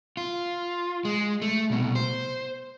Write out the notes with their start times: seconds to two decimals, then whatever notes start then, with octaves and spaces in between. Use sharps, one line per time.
0.17 F4
1.05 G#3
1.42 A3
1.70 C2 B2
1.95 C5